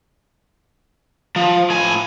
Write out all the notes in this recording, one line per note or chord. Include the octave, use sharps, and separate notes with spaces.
F3
A2 G#5